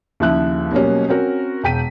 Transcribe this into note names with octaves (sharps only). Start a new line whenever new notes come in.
D#2 C#3 F3 E4 E5 F#6
B2 F#3 G3 A#3 C#4
C4 C#4 F#4 A#4
E1 G5 B6 D#7